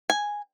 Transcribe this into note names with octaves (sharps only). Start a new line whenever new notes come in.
G#5